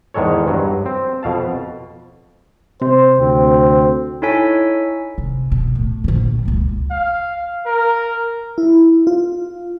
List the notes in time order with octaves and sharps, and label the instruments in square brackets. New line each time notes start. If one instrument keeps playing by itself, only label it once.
[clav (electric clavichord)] E2 G#2 D#3 G#3 A4 C#5
G2 F#3
C4
F2 B2 F5 A5
[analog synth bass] C3 [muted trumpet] C5
[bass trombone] D2 [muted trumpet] C4
[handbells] D#4 E4 A4 C#5 G#5 B6
[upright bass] C3
B2
A2
A#1 D3
C#2 A#3
[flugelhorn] F5
A#4
[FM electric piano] E4
F4